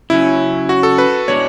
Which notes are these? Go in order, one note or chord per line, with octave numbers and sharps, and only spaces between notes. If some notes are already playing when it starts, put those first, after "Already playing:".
C#3 F#3 C#4 E4
F#4
A4
B4
B2 G#3 D4 C#5